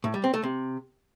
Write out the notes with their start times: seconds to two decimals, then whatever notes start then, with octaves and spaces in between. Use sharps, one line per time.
0.04 A2
0.14 G3
0.24 C4
0.34 A3
0.43 C3